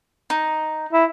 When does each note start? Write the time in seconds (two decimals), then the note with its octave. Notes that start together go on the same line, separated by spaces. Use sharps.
0.30 D#4
0.93 E4